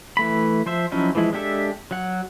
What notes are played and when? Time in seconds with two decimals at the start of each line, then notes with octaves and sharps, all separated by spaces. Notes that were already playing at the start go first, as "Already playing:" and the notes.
0.17 E3 A3 B5
0.66 F3 C5 E5
0.92 F3 F#3 C#4 D#4 E4
1.15 E3 F3 G#3 E4
1.33 G#3 D4 G4 A4 E5
1.91 F#3 F#5